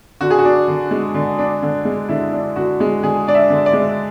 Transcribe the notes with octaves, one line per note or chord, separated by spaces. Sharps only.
D3 F#4
G#4
F#4
D4
D3
G#3
D3
D4
D3
G#3
D3 E4
D4
D3 F#4
G#3
D3 G#4
D4 D5
E5
D3
D5
G#3